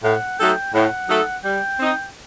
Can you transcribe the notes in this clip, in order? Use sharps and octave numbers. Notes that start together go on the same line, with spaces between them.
A2 F#5
F#3 A3 D#4 A4 G5
A2 F#5
F#3 A3 D#4 A4
G3 G5
C4 D#4